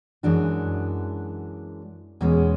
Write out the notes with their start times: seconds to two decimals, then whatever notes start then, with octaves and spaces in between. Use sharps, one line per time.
0.23 F#2 E3 G#3 D4 F#4
2.21 E2 B2 G#3 C#4